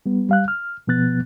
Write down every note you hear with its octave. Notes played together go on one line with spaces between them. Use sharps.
G3 B3
G3 F5 F#6
F6
B2 F3 B3 F#6 A6